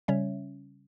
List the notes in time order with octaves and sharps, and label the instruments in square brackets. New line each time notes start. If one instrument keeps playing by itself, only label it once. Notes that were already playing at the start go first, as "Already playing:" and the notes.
[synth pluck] C#3 G3 C#4 C#5 E5